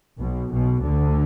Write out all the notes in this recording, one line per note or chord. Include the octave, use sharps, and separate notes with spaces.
B1 B2
B1 B2
D2 D3